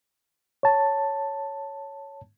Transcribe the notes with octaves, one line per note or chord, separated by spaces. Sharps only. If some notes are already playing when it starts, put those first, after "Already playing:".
C#5 A5